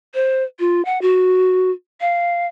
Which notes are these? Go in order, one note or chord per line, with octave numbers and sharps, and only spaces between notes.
C5
F4
F#5
F#4
F5